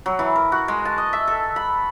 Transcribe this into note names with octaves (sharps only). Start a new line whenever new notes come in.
F#3
E3
A#4
F#4
G#3
A5
D#5
E5
A4
B5